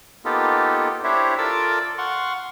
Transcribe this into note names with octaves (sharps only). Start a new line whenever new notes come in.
A#3 B3 D#4 F4 G4 A4
D4 E4 G4 C5 C#5 E5
F4 A4 A#4 D5 D6 E6
F5 F#5 C6 C#6